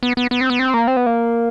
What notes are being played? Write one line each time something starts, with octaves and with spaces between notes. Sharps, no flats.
B3
B3
B3
C4
B3
C4
A#3
C4
B3
A#3